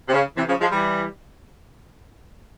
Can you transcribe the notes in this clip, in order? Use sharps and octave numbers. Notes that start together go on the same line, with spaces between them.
C3
C#3
C3 E3
C#3 F3
F3 G#3
E3 G3